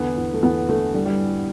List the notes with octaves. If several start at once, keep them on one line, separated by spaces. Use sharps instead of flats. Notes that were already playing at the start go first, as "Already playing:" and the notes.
Already playing: E2 D3 B3
E2
A3
E2 B3
D3 A3
D3 G3
G3